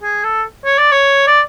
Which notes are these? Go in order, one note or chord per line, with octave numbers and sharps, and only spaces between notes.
G#4
A4
C#5
D5
C#5
D5